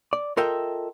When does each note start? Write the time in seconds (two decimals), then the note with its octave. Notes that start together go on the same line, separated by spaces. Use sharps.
0.13 D5
0.37 F4 A4 A#4 D#5 E5 G5